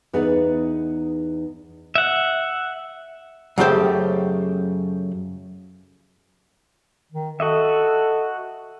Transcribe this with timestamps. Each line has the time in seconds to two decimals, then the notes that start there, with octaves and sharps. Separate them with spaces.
0.13 E2 B3 D#4 G#4 D5 F#5
1.95 E5 F#5
3.58 F#2 C#3 A3 G4 C5 G5
7.12 D#3
7.40 F#4 A4 D#5 E5